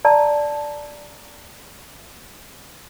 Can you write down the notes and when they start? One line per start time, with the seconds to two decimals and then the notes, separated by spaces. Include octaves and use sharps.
0.05 D5 A5 A#5